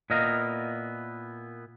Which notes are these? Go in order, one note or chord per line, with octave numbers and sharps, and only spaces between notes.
A#2 B3 E4 D#5 F5 A#5